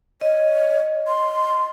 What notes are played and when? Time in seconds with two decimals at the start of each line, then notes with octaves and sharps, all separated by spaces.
0.21 C#5 D#5
1.07 C6